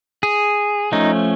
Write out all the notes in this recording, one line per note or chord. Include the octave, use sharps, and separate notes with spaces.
G#4
F3 A3 C#4 D#4